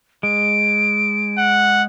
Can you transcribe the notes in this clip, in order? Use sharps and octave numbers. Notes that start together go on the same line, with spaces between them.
G#3 D7
F#5